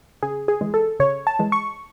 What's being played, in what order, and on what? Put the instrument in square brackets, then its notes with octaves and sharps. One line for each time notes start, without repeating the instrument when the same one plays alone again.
[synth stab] C#3 G#4
G#4
E3 G#3
A4
C#3 C#5
A5
E3 G#3
C#6